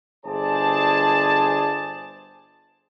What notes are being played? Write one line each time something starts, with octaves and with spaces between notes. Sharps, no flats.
G1 G#4 C5 D5 A5